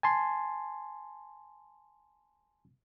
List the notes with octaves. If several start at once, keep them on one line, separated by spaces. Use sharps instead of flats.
G#5 A5 C6